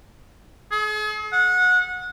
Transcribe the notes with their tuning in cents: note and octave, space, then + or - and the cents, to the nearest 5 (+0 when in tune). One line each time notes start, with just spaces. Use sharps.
G#4 +45
F#5 -25